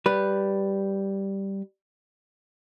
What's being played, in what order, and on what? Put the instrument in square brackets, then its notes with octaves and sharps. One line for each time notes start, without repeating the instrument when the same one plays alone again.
[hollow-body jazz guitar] G3 B4